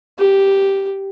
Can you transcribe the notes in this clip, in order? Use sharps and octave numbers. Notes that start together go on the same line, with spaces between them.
G4